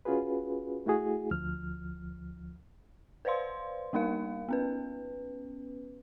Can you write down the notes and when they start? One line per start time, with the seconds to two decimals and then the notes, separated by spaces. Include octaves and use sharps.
0.05 C#4 F4 F#4 G#4 B4
0.86 A3 E4 F#4 G#4
1.31 D2 F3 F6
3.25 B4 C5 D5 F5 C6
3.93 G3 A#3 D#4 A#4 F5
4.49 B3 C#4 B4